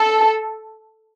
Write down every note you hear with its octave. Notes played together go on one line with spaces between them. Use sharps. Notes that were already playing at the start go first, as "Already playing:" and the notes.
Already playing: A4